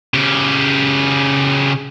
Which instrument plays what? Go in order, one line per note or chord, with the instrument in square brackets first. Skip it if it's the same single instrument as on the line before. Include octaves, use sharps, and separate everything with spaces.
[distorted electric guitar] C#3 G4